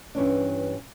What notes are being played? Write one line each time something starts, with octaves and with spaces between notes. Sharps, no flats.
G2 E3 C#4 D4